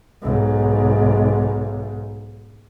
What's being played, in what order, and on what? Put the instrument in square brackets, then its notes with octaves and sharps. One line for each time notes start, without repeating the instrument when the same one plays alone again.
[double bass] B1 G#2